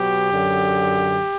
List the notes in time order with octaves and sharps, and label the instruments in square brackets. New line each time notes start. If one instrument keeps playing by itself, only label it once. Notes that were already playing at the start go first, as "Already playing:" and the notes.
Already playing: [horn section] B2 F#3 G4
F#2 D3 F#3